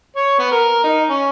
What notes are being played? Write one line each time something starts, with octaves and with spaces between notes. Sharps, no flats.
C#5
B3
A#4
D#4
C#4